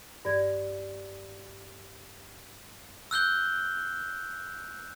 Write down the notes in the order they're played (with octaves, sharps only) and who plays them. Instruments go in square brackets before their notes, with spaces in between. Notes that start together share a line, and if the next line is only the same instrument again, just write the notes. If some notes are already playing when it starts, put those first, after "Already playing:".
[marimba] G2 D5 G#6
[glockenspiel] E6 F#6 G6 G7